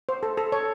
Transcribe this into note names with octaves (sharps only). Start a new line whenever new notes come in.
C5
A4
A4
C#5